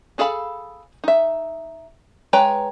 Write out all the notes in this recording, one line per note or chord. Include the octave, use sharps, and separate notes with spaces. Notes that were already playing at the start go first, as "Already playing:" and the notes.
D4 G#4 A4 F5 B5
D#4 E5
G#3 B4 C#5 G5 A#5